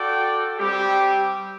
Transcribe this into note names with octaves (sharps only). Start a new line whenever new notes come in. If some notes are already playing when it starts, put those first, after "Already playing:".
Already playing: F#4 A4 D5 G5
G3 C4 G4